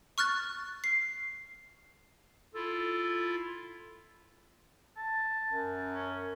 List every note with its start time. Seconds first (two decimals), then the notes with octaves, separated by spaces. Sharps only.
0.18 C#6 F6 F#6 A6
0.84 C7
2.55 E4 F4 A4
4.97 A5
5.49 F#2
5.94 C#4